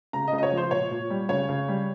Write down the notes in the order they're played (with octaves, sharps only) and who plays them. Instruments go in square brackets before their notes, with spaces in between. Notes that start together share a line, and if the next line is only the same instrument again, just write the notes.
[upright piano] C#3 A#5
D#5
C#3
D#5
C#5
F3 C5
A#2 C#5
A#2
G3
C#3 C#5
C#3
G3